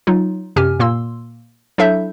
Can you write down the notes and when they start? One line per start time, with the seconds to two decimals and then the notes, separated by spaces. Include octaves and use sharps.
0.07 F#3 D#4 F4
0.56 F#2 C3 G4 G#5 F6
0.80 A#2 A#3 C6 E6
1.78 F#3 D4 E4 A4 E5 G6